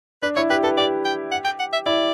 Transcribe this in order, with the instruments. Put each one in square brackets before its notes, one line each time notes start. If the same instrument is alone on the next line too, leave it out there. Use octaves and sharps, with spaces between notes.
[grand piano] D4 [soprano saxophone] B4
[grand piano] E4 [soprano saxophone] C#5
[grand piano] G4 [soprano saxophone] B4
[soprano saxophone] A4 [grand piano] B4
[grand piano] G4 [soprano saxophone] D5
[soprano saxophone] G5
F#5
G5
F#5
E5
[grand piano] E4 [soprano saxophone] D5